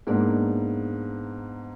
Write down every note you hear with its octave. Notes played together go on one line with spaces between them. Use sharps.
G#2 A#3 B3 D4